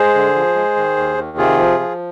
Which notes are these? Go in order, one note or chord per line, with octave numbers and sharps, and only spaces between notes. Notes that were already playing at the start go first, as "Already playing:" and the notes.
Already playing: G#3 G#4 C5
D3
F3
G#3
D#3
D#2
D#3
C3 F4 G#4
F3
F3